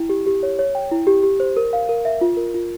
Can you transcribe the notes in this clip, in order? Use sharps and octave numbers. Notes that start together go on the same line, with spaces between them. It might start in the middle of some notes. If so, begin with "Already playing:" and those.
Already playing: E4 G5
G4
G4
C#5
C#5
G5
E4
G4
G4
C5
A#4
F5
A#4
E5
F4
A#4
F4